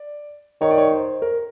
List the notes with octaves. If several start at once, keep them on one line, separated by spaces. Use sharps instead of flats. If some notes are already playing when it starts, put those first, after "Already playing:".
Already playing: D5
D#3 C#5
D5
C#5
C5
A#4